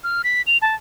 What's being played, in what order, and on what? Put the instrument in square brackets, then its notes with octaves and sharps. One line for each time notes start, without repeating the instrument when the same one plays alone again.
[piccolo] F6
B6
F7
A5